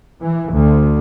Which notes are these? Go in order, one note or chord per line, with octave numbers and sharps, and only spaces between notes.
E3
D2